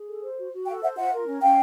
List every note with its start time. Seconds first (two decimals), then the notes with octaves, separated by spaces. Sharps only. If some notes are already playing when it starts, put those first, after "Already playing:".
Already playing: G#4
0.09 A4
0.23 C5
0.38 F#4
0.53 F#4
0.67 A4 F5 G5
0.82 C5 E5 F#5
0.97 F4 E5 F#5
1.12 A#4
1.27 C#4
1.42 C#4 F5 G5